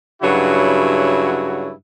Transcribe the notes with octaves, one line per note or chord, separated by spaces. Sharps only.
G2 C#3 F#3 E4 F#4